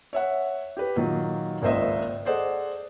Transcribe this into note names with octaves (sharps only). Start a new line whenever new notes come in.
C#5 E5 F#5
G4 B4
A#2 D#3 F#3
G#1 C#2 A#3 C5 D#5 E5
G#4 A4 C5 D5 D#5 F#5